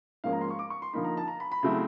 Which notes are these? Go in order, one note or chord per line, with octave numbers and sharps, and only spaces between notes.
G#2 F3 A#3 C#4 F5
A#5
C6
C#6
D6
C#6
C6
D3 F3 A#3 D#4 B5
A#5
A5
A#5
B5
B5
C#3 F#3 A3 C4 E4